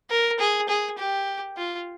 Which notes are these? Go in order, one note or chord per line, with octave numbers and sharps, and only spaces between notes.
A#4
G#4
G#4
G4
F4